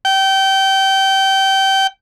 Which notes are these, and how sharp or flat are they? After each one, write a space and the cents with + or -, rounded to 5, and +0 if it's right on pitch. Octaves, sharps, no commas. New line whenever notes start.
G5 -25